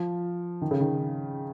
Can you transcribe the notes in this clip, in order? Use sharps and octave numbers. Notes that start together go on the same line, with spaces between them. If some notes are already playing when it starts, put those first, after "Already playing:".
Already playing: F3
D#3
C#3
D#3